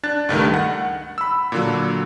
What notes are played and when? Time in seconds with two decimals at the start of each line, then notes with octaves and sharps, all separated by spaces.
0.03 D4 F#6 A6
0.29 C#2 G2 D#3 A3
0.54 F#5
1.18 B5 E6
1.52 A#2 D3 F#3